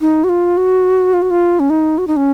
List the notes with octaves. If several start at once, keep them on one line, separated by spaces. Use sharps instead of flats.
D#4
F#4
F4
F#4
F4
F#4
F4
C#4
D#4
F#4
D#4
C#4